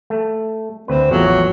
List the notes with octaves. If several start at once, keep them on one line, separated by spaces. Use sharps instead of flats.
A3
D2 C4 B4
A1 E2 F3 F#3